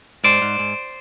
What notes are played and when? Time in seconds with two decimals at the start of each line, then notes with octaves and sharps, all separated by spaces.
0.24 G#2 C5 D5
0.42 G#2
0.59 G#2